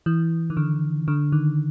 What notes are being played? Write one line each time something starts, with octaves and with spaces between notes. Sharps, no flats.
E3
D#3
D3
D3
D#3